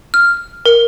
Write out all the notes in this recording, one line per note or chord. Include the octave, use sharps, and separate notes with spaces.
F6
A#4